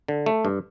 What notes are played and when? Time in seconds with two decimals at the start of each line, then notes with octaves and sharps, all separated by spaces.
0.08 D3
0.26 A3
0.45 G2